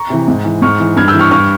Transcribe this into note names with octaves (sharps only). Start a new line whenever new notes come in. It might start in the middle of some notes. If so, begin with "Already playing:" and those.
Already playing: A#5 C#6
C3 E3
G#2
E3
G#2 C#6 F6
E3
G2 F6 G#6
E6 G6
E3
C#6 F6
G2 C#6 F6